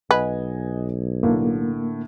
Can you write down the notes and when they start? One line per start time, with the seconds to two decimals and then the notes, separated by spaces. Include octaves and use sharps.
0.11 B1 B4 D#5 F#5 G#5
1.23 A2 D3 A#3